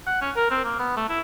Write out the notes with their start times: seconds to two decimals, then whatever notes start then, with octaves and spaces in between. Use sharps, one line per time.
0.07 F#5
0.21 C#4
0.36 A#4
0.51 C4
0.65 A#3
0.79 B3
0.97 A3
1.09 E4